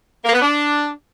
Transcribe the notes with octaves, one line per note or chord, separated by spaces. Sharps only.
A#3
B3
D4